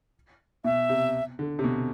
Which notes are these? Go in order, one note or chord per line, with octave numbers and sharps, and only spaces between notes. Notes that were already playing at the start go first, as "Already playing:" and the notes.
B2 E5
C3
D3
C3
B2